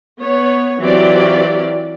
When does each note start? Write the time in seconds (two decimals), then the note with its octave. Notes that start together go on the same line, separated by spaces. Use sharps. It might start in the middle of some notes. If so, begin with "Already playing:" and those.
0.21 B3 C#5
0.80 E3 F#3 C4 F4 G4 D5